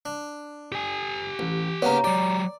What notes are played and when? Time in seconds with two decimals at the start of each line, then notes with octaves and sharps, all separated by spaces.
0.06 D4
0.72 G4 G#5
1.39 A1
1.82 C#3 A#3 B3 C#5 A#5
2.04 F#3 G4 D5